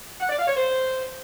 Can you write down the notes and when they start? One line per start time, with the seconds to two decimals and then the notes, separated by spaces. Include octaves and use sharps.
0.21 F#5
0.30 D5
0.39 F5
0.48 C#5
0.57 C5